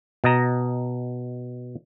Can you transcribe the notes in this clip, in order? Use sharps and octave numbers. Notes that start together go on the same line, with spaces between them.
B2 D#5 A#5